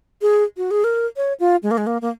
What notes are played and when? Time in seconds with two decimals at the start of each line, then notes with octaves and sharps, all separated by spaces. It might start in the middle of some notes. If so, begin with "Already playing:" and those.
0.22 G#4
0.57 F#4
0.71 G#4
0.84 A#4
1.16 C#5
1.40 F4
1.63 G#3
1.71 A#3
1.78 G#3
1.87 A#3
2.02 A#3